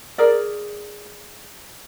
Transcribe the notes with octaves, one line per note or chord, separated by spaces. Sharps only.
G#4 A#4 D5